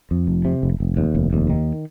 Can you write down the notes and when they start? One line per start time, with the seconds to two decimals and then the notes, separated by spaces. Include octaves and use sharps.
0.11 F2
0.28 F1
0.45 C3
0.63 F1
0.80 F1
0.97 D#2
1.15 F1
1.33 D#2
1.50 D#3